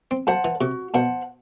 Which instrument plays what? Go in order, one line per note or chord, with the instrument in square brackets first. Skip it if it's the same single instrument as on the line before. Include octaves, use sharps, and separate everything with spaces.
[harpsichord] C4
[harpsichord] F#3 [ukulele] C5 F#5 A5
[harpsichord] E3
[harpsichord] C3 [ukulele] F#4
[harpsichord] B2 [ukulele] C5 F#5 A5